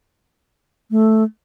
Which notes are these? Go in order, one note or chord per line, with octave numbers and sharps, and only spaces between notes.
A3